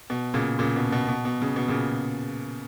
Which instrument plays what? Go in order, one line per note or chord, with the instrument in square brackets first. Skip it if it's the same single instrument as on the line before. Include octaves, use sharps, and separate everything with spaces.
[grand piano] B2
A#2 C#3
A#2 C#3
B2
B2
B2
B2
C#3
B2
A#2 C#3